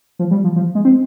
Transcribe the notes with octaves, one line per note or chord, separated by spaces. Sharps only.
F3
G3
F3
F3
G#3
C4